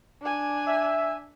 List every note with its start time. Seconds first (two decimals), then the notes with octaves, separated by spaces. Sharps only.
0.22 D4 G#5
0.67 E5